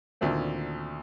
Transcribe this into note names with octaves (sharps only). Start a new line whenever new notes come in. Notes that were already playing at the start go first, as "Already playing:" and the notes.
D2 A#2 D#3 A3 C4